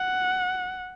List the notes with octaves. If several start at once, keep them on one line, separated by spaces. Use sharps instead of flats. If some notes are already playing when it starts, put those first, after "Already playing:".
Already playing: F#5